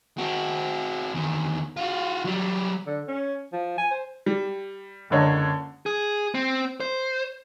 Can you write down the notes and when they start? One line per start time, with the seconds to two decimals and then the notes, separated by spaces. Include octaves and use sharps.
0.18 C4 F#4
1.15 E2 D#3
1.76 F4 F#4
2.25 F#3 G3
2.87 D3
3.08 C#4
3.53 F3
3.78 G#5
3.91 C5
4.26 G3
5.10 F#1 C#2 D3 C#5 D#5
5.86 G#4
6.35 C4
6.80 C5